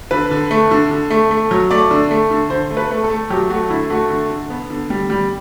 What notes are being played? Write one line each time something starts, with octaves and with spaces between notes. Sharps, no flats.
D3 B4
D3
A3
D3
D3
A3
A3
F#3
A3 D5
D3
A3
D3
D3 C5
A3
B4
A3
A4
A3
F#3 G4
A3 F#4
D3 E4
A3 F#4
D3
D3
B3
D3
G3
G3